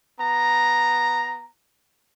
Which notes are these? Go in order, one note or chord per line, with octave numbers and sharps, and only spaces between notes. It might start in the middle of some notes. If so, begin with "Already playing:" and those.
B3 A#5